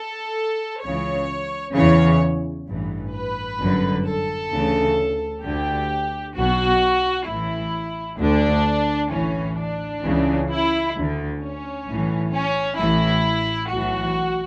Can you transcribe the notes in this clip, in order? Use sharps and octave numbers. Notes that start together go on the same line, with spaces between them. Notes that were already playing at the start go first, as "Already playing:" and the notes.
Already playing: A4
C#2 C#3 E3 C#5
E2 C#3 E3 C#5
A1 G2 E3
B4
G1 F#2 D3
A4
D2 C#3 E3
D2 D3 G4
B1 B2 F#4
A1 A2 E3 E4
D2 D3 D4
A1 A2 E3 C#4
D4
C#2 C#3 E3
E4
D2 D3
C#4
B1 A2 E3
C#4
A1 A2 E3 E4
B1 A2 E3 F#4